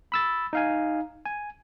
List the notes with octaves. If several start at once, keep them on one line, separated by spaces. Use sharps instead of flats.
B5 E6 A6
D#4 F5 G#5
G#5